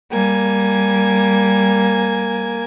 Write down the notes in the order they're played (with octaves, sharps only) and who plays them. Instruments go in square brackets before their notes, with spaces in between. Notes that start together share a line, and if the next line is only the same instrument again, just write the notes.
[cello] G3 [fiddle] A#3 G#5